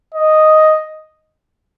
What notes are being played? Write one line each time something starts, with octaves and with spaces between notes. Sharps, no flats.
D#5